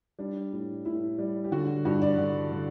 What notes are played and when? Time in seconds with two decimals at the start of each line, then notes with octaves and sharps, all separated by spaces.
0.19 G3 D4
0.53 A2
0.85 A2 E4
1.19 G3
1.45 G4
1.52 D3 F#4
1.85 G2 F#4
2.02 D5
2.18 D3
2.52 D3